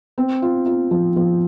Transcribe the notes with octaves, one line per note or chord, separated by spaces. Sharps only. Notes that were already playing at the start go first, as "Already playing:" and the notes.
C4
F4
F4
F3
F3